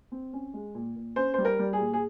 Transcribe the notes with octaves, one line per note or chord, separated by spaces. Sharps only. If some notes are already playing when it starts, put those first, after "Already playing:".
C4
C#4
G#3
A#2
A#2
C#4 C5
G3 C5
A#4
G3
G#4
A#2
G#4